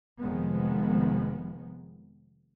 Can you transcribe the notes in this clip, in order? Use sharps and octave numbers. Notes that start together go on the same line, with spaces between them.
F1 D#3 F3 G#3 B3